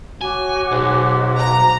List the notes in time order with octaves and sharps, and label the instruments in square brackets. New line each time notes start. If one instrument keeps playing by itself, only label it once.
[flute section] F#4 C#5 D6 [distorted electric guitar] G#5
[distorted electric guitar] B1 [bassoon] G#2
[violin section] A#5